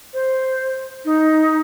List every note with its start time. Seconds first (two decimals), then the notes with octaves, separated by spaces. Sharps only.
0.14 C5
1.05 D#4